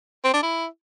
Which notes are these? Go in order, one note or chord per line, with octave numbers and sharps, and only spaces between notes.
C4
D4
E4